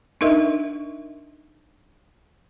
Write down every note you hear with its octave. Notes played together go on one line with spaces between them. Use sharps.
D4 D#4 A#4 D#5 E5